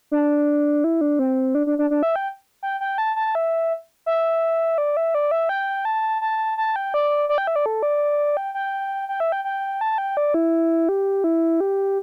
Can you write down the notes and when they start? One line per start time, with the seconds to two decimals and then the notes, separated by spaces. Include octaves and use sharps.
0.11 D4
0.84 E4
1.01 D4
1.19 C4
1.55 D4
1.67 D4
1.79 D4
1.91 D4
2.03 E5
2.16 G5
2.63 G5
2.81 G5
2.98 A5
3.16 A5
3.35 E5
4.06 E5
4.78 D5
4.97 E5
5.15 D5
5.31 E5
5.49 G5
5.85 A5
6.21 A5
6.58 A5
6.76 G5
6.94 D5
7.29 D5
7.38 G5
7.47 E5
7.56 D5
7.66 A4
7.83 D5
8.37 G5
8.55 G5
9.09 G5
9.20 E5
9.32 G5
9.45 G5
9.81 A5
9.98 G5
10.17 D5
10.34 E4
10.89 G4
11.24 E4
11.60 G4